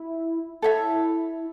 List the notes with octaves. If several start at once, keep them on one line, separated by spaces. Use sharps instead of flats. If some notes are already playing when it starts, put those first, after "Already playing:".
Already playing: E4
E4 A4 C#5 E5